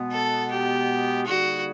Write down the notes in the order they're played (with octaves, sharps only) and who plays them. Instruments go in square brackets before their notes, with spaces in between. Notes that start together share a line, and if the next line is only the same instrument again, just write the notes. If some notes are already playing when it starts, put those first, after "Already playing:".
Already playing: [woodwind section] B2 G#3 B3
[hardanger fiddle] A4
G4
[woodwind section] D3 G3 A#3 D#4 G#4 [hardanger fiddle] F#4